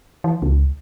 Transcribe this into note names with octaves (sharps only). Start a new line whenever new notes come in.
E3
C#2